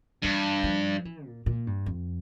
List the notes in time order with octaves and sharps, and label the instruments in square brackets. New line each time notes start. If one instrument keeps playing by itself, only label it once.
[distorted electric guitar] G2 [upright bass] E3
[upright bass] F3
E3
A#2
A#2
G2
F2